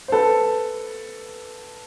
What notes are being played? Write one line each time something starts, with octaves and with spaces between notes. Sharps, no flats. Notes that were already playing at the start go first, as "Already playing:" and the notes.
C5
A4 B4